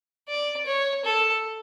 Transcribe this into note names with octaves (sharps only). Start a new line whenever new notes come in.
D5
C#5
A4